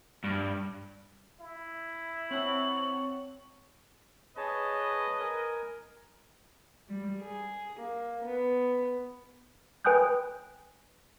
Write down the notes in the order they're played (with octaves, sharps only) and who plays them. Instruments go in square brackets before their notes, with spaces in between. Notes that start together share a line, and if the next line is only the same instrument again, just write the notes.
[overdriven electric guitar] G2
[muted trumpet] E4
[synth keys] C4 F#5 A5 [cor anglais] C#5 [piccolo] F#7
[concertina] G#4 C#5 A5 [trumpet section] B4 D#5
[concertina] A#4 G#5
[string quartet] G3
G#4
A#3
B3
[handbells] B4 G5 G#5 D#6 F#6 G6